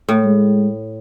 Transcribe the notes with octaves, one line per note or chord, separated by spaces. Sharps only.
A2
G#3